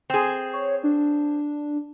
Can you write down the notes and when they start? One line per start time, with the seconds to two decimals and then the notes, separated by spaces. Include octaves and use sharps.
0.10 C4 G#4
0.53 C#5
0.84 D4